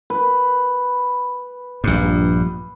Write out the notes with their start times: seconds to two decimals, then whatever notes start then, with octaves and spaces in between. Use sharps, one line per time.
0.10 B4
1.84 A#1 G2